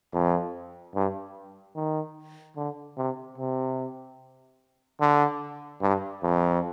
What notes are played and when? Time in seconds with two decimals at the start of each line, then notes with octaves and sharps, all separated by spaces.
0.13 F2
0.94 G2
1.76 D#3
2.57 D3
2.97 C3
3.38 C3
5.01 D3
5.81 G2
6.23 F2